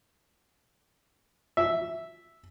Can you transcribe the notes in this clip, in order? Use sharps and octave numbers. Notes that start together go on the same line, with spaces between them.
E5